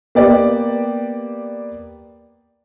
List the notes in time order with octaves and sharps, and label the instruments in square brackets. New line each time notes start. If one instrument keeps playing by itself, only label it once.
[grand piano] A#3 B3 G4 D5